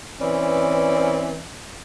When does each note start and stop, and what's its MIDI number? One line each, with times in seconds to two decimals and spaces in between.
0.21 1.42 52
0.21 1.42 60
0.21 1.42 61
0.21 1.42 71
0.21 1.42 74